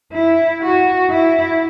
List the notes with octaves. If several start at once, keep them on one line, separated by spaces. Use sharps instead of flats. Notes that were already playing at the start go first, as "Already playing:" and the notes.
E4
F#4
E4